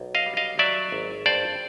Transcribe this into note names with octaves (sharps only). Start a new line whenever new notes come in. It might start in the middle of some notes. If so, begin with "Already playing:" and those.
Already playing: B1
D#5 F5
G3
D#5 F5
F#3 D5 E5
G#1
G2 C5 D5